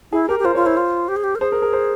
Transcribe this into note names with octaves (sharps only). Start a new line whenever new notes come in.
E4 G#4
G4 A#4
G4
F4 C5
F4 C#5
E4 C5
F4
G4
G#4
G4
A#4
G#4 C5
A#4
A#4
C5